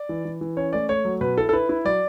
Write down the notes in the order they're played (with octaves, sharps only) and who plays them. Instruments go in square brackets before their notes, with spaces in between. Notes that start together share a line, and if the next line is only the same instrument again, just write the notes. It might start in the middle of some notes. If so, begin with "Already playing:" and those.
Already playing: [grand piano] D5
E3
E3
E3
C#4 C#5
A3 D5
A3 C#5
F#3
B2 B4
E4 A4
A4
E4 B4
E4
F#3 D5